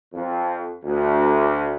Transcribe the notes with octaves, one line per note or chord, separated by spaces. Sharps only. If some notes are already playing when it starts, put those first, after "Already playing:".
F2
D2